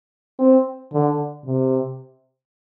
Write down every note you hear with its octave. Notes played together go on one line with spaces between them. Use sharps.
C4
D3
C3